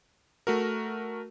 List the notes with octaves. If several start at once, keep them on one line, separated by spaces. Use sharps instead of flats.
A3 F#4 A#4